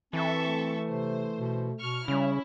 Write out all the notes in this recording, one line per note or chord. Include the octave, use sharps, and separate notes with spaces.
E3 C4 A4 E5 C#6
A3
C3 C5
B2
B2 C#6 F6
C#3 G3 C#4 E4